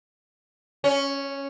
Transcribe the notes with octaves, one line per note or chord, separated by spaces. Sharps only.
C#4